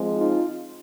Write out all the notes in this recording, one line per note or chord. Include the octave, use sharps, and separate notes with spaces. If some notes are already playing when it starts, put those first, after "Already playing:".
Already playing: F3 G#3 C4
D#4 F4